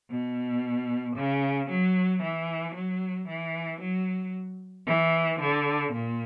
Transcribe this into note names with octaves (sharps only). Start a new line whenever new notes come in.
B2
C#3
F#3
E3
F#3
E3
F#3
E3
D3
A#2